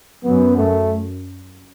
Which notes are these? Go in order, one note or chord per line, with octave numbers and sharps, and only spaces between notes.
F#2 B3
A3